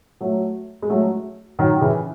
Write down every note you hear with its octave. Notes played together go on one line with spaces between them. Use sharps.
F#3 A3
G#3
F#3 A3
D#3 F#3
C#3 E3